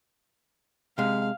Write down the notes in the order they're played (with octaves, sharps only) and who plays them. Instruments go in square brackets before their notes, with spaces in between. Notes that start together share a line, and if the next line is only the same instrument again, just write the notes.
[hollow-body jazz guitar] C3 G#3 [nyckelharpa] F5